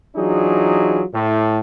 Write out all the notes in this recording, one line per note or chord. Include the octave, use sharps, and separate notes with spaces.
E3 F#3 D4 D#4 F4 G#4
A2